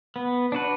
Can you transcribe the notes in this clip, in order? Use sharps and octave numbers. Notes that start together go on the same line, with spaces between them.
B3
D4 F#4 B4